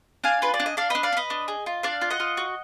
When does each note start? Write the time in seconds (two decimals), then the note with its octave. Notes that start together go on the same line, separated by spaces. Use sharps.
0.24 D4 F5 G#5
0.42 F4 B4
0.54 D5
0.60 D4
0.66 D#5
0.77 D4 D5 F5
0.90 D4 B4 D#5
1.03 D5 F5
1.13 D4
1.17 B4 D#5
1.30 D4
1.48 G#4
1.66 F4
1.83 D4 D5 F5
2.01 F4
2.11 D#5 F#5
2.20 F4
2.37 F#4